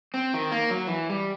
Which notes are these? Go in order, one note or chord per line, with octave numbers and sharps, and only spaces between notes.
C4
D#3
A#3
F#3
E3
G3